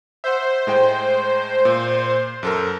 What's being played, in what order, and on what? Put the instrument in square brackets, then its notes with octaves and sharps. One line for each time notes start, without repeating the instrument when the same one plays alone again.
[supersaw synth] C5 [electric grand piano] E5 F#5
[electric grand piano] A2 G#3 G5
A#2
F#2 A4 A#4